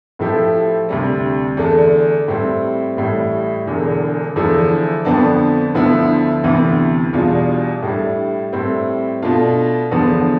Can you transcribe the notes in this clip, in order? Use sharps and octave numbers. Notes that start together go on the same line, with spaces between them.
A2 F3 A3 E4 G4
D2 C3 G3
E2 D3 A3 D4
A2 G3 C4
A1 A2 G3
E1 E2 D3
E2 D3 F3 A3 E4
F2 D3 F3 B3 D4
D2 D3 F3 B3 E4
D2 C3 E3 B3
E2 B2 G3 D4 F4
A2 G3 D4
A2 G3 C4
B2 A3 D4 F4
E2 D3 F3 B3